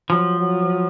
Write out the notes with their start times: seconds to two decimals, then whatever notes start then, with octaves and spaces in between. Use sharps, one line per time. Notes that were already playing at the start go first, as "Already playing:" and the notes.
0.10 F3 F#3
0.40 F#3